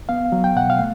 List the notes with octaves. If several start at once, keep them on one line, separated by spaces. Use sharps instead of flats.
B3 F5
F#3
G5
B2 F#5
F5
A3